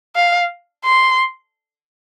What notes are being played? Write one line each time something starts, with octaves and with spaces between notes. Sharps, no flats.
F5
C6